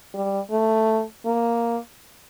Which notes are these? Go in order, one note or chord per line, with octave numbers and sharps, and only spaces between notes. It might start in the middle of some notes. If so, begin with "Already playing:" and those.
G3
A3
A#3